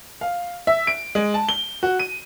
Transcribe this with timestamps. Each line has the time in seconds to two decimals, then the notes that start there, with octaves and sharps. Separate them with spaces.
0.21 F5
0.67 E5
0.87 D7
1.15 G#3
1.34 A5
1.49 G7
1.83 F#4
1.99 D#7